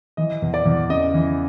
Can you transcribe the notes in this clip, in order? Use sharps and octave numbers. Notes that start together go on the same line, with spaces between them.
E3 D#5
E2
D5
E2
C#3 D#5
E3